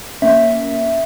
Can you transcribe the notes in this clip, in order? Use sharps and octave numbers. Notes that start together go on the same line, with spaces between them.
A#3 C#4 E5